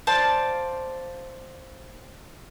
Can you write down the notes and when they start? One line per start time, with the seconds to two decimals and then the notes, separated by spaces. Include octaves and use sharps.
0.07 C5 D5 F5 A5